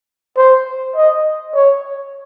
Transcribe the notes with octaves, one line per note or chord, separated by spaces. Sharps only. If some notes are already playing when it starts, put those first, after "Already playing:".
C5
D#5
C#5